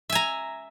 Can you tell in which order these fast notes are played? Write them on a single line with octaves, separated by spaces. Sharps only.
E5 G#5 A#5